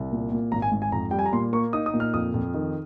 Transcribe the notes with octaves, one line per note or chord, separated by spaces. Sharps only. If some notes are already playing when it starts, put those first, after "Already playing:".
Already playing: C2
A#2
A#2
G#1 A#5
G#5
G#2
G#5
F2 A#5
G3 G5
G#5
A#5
A#2 C6
A#3 C#6
D#4 D#6
D#6
A#2
F6
F2 D#6
F2
D#3